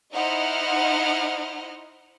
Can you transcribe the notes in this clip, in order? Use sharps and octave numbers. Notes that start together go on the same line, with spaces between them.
D#4 E4 C5 D#5 F#5 F6